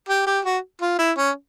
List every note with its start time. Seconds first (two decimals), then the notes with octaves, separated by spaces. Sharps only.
0.09 G4
0.27 G4
0.45 F#4
0.81 F4
0.99 E4
1.17 C#4